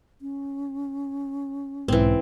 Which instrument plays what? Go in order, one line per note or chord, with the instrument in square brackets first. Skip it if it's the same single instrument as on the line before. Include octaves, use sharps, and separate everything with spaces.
[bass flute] C#4
[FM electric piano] B1 G#2 [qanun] E3 C4